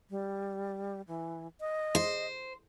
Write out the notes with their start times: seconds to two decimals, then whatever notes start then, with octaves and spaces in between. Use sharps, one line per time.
0.10 G3
1.08 E3
1.61 D#5
1.95 C5